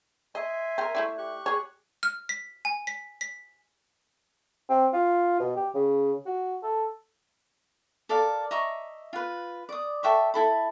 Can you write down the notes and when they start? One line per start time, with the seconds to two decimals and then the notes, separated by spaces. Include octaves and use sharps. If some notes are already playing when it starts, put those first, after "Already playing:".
0.35 D#5 E5 G#5 C6
0.78 C4 A#4
0.95 A3 E4 D5
1.18 G4 C#6 F#6
1.46 G#4 C#5
2.03 F6
2.29 B6
2.65 G#5
2.87 B6
3.21 B6
4.70 C4
4.93 F4
5.40 B2
5.56 G4
5.75 C#3
6.26 F#4
6.63 A4
8.09 A4 A#4 D5 F5
8.51 D#5 E5 A#5 C#6
9.13 F4 B4
9.69 D5 D#6
10.03 A4 E5 G5 C#6
10.34 E4 A4 B5